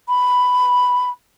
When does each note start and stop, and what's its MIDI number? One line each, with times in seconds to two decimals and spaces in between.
0.08 1.09 83